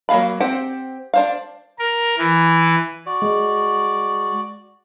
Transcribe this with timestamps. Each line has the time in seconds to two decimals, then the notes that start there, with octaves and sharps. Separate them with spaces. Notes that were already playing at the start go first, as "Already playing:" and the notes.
0.09 F#3 A#3 G#4 F5 B5
0.40 C4 G4 C5 F#5 G5
1.14 D4 C5 F5
1.79 A#4
2.18 E3
3.06 F#4 D5
3.22 G#3